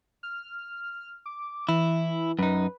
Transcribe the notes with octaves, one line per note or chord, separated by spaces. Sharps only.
F6
D6
E3 E4
F#2 D#4 B4